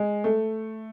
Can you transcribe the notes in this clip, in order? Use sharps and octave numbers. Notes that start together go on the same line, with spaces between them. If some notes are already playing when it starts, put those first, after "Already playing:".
Already playing: G#3
A3